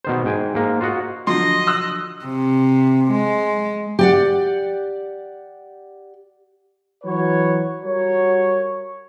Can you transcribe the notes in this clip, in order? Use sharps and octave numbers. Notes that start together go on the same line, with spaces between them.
B2 D#3 C5
G#2 G5 G#5
G#2 A#3
F4 F#4 D#5 F#5
D3 F3 F#3 D#5 C6
D#6 E6 F#6
C3
G#3
G4 D5 F#5
E3 F#3 B4 C#5
G3 F#4 A#4 C#5